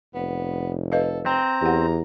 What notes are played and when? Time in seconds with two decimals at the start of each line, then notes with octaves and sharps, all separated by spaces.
0.15 F1 B3
0.92 A4 B4 D#5 F5
1.26 C4 A#5
1.61 E2 G4 F#5